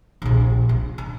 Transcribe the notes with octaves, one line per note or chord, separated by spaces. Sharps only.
A#1 C3
C#4
C#4